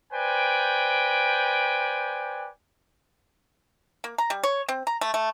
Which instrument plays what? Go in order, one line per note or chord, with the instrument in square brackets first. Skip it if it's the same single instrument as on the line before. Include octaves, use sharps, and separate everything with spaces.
[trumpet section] B4 C5 D5 G5 G#5
[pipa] A#3
A#5
G3
C#5
C4
A#5
A3
A3